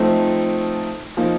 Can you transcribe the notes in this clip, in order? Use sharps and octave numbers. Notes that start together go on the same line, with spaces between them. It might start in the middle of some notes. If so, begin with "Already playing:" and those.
Already playing: F3 A3 C4 D#4
F3 A#3 D#4